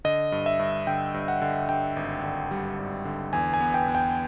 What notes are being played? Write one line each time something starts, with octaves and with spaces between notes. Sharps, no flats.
D3 D#5
G2
E5
G2
D3 G5
G2
F#5
D3
G2 G5
G#1
D3
G3
G#1
D3
E2 G#5
G#5
B3
G5
E2
G5